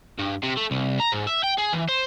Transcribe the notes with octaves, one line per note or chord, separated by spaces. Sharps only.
G2
C3
A3
C2
A#5
G#2
E5
G5
G#4
E3
C5